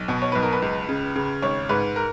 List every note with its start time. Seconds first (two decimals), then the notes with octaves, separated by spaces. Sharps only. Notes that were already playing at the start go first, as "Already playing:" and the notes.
Already playing: B1
0.08 B2
0.22 C#5
0.32 B1 B4
0.42 A#4
0.53 B4
0.62 C#2
0.89 C#3
1.16 C#3
1.42 G#1 C#5
1.69 G#2 B4
1.96 A#4